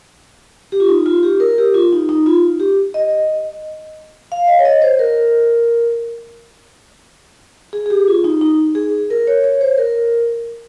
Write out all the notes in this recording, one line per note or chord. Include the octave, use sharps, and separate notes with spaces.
G4
F4
D#4
F4
G4
A#4
G4
F4
D#4
D#4
F4
G4
D#5
F5
D#5
C#5
D#5
C5
A#4
G#4
G#4
G4
F4
D#4
D#4
G#4
A#4
C#5
C#5
C5
A#4